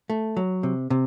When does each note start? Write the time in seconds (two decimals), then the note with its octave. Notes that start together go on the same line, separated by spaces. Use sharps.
0.10 A3
0.37 F#3
0.63 C3
0.90 C3